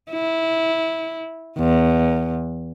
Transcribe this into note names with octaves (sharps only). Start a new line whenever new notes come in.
E4
E2